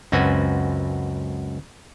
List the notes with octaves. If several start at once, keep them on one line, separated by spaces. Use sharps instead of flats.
C#2 F#2 C4 F#4 B4 G#5